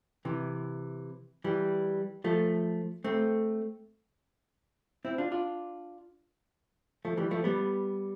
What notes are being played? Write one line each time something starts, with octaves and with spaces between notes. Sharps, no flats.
C3 E3
E3 G3
F3 A3
A3 C4
C4 E4
D4 F4
D4 F4
F3 A3
E3 G3
F3 A3
G3 B3